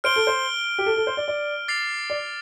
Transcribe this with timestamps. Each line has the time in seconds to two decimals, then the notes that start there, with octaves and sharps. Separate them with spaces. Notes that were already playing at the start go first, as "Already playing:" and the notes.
0.04 C5 F6 D7 G7
0.16 A4
0.27 C5
0.78 G4
0.86 A4
0.97 A4
1.07 C5
1.17 D5
1.28 D5
1.68 D6 A6 C7 F7
2.10 D5